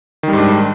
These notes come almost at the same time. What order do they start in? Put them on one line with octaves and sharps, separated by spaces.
D#3 G3 G#2 D4